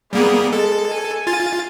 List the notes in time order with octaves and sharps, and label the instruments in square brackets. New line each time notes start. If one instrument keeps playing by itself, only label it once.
[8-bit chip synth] G3 A#3 B3 [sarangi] G#4
[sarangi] G#3 [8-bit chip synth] A4
[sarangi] G#5
[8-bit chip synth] F4 A6